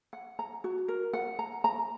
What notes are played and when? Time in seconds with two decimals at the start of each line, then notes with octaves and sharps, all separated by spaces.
0.13 F#5
0.39 A#5
0.64 F#4
0.88 A#4
1.13 F#5
1.39 A#5
1.64 A#5